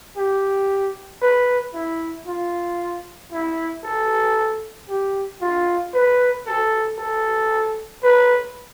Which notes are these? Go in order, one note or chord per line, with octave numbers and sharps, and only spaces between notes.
G4
B4
E4
F4
E4
A4
G4
F4
B4
A4
A4
B4